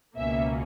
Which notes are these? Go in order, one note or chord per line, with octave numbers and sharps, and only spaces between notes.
C#2 B2 A#3 C#4 E5